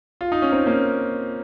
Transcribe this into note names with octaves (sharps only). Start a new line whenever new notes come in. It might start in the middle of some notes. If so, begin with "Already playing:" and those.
F4
D#4
C#4
C4 D#4
A#3 C#4